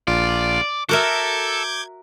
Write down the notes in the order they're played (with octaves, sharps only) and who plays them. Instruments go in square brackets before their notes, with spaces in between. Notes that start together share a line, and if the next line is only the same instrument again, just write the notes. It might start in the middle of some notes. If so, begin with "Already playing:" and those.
[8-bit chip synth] A#1 F4 [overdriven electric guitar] D5
[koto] F#4 A#4 E5 [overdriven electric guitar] A4 [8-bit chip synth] D6 G6 G#6